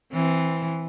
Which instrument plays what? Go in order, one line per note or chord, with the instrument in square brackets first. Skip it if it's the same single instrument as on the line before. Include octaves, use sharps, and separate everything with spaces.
[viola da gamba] E3 C4